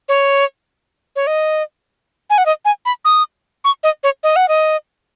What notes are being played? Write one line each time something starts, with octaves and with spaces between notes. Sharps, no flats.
C#5
C#5
D#5
G#5
F#5
D#5
G#5
B5
D#6
C#6
D#5
C#5
D#5
F#5
D#5